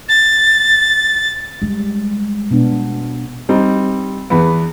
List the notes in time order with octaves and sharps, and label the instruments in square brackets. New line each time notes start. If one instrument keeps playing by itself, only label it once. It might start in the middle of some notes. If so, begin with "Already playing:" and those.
[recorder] A6
[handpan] G3 [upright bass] G#3
[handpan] B2 B3 D4
[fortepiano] G3 C4 D#4
E2 B3